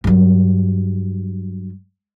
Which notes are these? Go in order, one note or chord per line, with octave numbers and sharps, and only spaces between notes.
G2 F#3